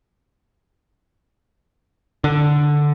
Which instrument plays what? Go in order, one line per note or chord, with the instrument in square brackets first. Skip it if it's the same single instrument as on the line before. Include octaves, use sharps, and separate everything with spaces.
[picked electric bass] D3